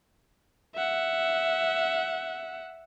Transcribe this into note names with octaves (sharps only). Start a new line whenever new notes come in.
E5 F#5